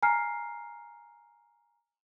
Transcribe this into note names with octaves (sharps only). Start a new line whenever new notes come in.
G#5 A#5 F6 C7